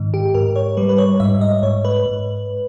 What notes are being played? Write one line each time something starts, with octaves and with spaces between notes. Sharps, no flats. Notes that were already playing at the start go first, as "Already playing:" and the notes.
Already playing: G#2 D#3
G4
G#2 A#4
C#5
G3 B4
B4
C#5
G#2 E5
D#5
G#2 C#5
B4
G#2